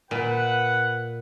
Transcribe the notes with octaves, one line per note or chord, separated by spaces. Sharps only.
A#2 B4 F#5